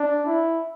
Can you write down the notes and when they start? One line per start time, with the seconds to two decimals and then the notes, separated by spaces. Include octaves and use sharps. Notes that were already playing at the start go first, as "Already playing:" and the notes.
Already playing: D4
0.25 E4